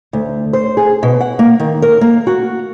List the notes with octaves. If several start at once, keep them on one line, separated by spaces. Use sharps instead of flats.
D2
C5
G#4
B2
F#5
A#3
D#3
A#4
A#3
F#4